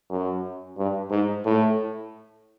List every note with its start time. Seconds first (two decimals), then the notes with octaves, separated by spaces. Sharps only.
0.10 F#2
0.78 G2
1.10 G#2
1.45 A2